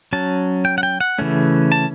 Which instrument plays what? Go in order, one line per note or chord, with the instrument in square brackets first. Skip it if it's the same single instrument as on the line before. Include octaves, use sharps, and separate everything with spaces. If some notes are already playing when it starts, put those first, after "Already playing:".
[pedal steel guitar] F#3 C#4 A5
G5
F#5
G5
F#5
C#3 E3 A3 C#4
A5